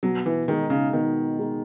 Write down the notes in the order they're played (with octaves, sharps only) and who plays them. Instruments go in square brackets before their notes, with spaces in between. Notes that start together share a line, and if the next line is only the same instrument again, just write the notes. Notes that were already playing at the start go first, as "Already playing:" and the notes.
[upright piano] B2 [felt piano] F#3
[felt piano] E3
[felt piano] D#3 [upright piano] G#3 D#4
[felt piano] C#3
[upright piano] B2 [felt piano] D#3
[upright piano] G#3 D#4